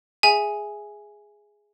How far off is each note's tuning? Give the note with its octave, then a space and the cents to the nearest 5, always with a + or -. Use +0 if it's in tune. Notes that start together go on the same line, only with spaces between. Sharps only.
G#4 +0 E5 +0 G#5 +0